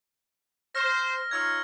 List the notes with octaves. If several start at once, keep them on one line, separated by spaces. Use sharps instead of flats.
C5 F6 A#6
D#4 F4 C#5 E6 F6 G#6